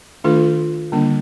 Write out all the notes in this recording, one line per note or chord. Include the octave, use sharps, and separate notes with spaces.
D#3 A3 D4 F4 A4
D3 G3 A#3 D4